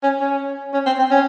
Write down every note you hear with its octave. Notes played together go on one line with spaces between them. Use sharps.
C#4
C#4
C#4
C4
C4
C#4